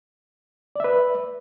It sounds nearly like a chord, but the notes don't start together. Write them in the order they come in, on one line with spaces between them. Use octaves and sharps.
D5 E5 B4